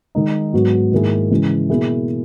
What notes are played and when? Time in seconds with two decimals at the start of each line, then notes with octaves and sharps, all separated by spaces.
0.15 D#3 G#3 D#4
0.53 G#2 F#3 B3 F#4
0.91 G#2 D#3 A#3 E4 G#4
1.31 C#3 E3 G#3
1.69 B2 A#3 E4 G#4